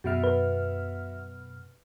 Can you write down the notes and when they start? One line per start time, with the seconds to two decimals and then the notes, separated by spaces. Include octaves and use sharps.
0.04 F#2 B2 F#4 E5 F6
0.23 B4